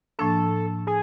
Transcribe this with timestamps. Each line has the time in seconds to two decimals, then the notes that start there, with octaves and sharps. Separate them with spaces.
0.19 A2 F3 A#3 D4 A4
0.87 G#4